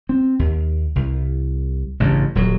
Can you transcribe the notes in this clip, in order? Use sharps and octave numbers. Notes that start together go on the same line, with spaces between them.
C4
D#2
C2
A1 G2 C#3
D#1 F#3